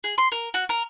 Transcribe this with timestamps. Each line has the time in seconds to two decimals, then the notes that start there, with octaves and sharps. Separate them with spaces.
0.04 G#4
0.18 C6
0.32 A#4
0.54 F#4
0.69 A#4